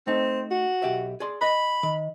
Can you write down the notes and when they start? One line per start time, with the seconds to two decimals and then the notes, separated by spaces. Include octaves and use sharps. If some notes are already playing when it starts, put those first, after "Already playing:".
0.07 A3 C4 D#4
0.51 F#4
0.82 B1 G4 E5
1.20 G#4 D5 C6
1.41 D#5 B5
1.83 D#3